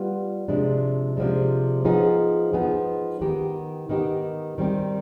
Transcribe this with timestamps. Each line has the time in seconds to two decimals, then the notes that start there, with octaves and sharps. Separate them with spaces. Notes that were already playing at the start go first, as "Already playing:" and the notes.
Already playing: G3 B3 F4
0.48 C3 F3 G#3 D4
1.17 C3 F3 G#3 D4
1.85 F3 B3 D#4 G#4
2.53 F3 B3 D#4 G#4
3.21 D#3 B3 D#4 G4
3.89 D#3 B3 D#4 G4
4.58 D#3 G3 C4 G4